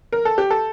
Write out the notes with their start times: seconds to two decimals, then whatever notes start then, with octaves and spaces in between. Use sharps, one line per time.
0.13 A#4
0.25 A4
0.38 G4
0.50 A4